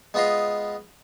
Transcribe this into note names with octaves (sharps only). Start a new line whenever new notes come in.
G#3 B3 F4 B4 D#5 F5